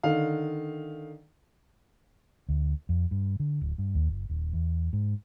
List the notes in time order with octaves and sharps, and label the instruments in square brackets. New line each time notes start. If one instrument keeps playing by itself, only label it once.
[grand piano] D3 D#3 F5
[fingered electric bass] D2
F2
G2
D3
D1
G2
D#2
F#1
D#1
E2
G#2